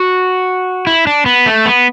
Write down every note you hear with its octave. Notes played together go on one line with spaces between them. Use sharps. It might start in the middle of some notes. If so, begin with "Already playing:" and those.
Already playing: F#4
E4
D4
B3
A3
B3